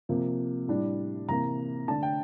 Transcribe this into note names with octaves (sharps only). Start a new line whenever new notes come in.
C3 F3 A#3
A2 G3 D4
C3 E3 A#3 A#5
D3 A3 D4 A5
G5